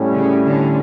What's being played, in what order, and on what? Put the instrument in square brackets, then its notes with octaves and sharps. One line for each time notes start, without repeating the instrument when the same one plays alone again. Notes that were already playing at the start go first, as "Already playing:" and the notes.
Already playing: [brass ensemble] A2 G3 C#4
[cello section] C#3
D3